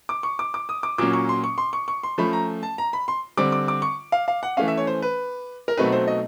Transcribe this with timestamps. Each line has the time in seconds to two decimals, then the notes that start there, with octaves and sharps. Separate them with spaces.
0.09 D6
0.23 C#6
0.39 D6
0.54 D6
0.69 D#6
0.83 D6
0.98 A#2 F#3 A#3 C#4 D6
1.13 C#6
1.29 C6
1.44 C#6
1.58 C6
1.73 C#6
1.88 C#6
2.03 C6
2.18 F3 A3 C#4 B5
2.33 A#5
2.63 A5
2.78 A#5
2.93 B5
3.08 C6
3.37 D3 G3 C4 D6
3.52 D6
3.68 D6
3.82 C#6
4.12 F5
4.28 F5
4.43 F#5
4.57 E3 A3 C#4 F5
4.68 E5
4.77 C#5
4.87 C5
5.02 B4
5.68 A#4
5.77 B2 F#3 A3 C4 D#4 B4
5.92 C5
6.08 D#5